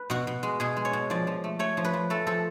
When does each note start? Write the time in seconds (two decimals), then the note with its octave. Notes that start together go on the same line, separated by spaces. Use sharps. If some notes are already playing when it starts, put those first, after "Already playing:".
Already playing: B4
0.10 B2 F#4
0.27 B2
0.43 G#3
0.60 B2 G#4
0.77 G#3
0.85 C#5
0.93 B2
1.10 F3 D5
1.27 F3
1.44 A3
1.59 A3 C#5
1.77 F3
1.85 B4
1.93 F3
2.10 A3 A4
2.27 F3 A4